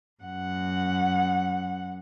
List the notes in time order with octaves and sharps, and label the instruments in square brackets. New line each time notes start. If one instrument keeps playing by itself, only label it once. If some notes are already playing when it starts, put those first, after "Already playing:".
[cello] F#2 F#5